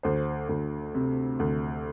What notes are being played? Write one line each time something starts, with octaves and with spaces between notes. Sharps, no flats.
D2 C5
D2
C3
D2